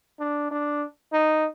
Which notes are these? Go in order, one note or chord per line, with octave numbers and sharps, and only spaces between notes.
D4
D4
D#4